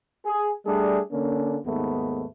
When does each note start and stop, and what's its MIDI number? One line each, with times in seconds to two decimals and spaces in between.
0.25 0.50 68
0.66 1.00 55
0.66 1.00 57
0.66 1.00 62
0.66 1.00 68
1.12 1.57 50
1.12 1.57 58
1.12 1.57 61
1.66 2.24 39
1.66 2.24 44
1.66 2.24 57
1.66 2.24 59